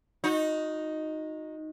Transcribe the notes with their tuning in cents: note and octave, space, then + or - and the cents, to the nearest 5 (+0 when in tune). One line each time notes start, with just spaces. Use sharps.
D#4 +0 F#4 -35